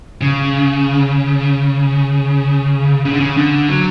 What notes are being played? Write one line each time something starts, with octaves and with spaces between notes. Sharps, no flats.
C#3
C#3
D3
C#3
D3
F#3